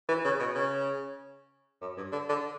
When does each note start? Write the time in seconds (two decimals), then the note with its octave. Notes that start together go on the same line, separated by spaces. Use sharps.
0.08 E3
0.24 C#3
0.39 B2
0.55 C#3
1.81 F#2
1.97 G2
2.12 D3
2.29 D3